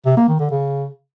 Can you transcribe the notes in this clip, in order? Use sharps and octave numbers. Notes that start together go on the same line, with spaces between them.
C3
A#3
D#3
D3
C#3